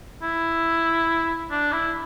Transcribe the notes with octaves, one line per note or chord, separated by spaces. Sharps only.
E4
D4
E4